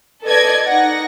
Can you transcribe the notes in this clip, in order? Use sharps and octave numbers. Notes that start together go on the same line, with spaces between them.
A4 B4 D5 D#5 G#6
D#4 F#5 A#6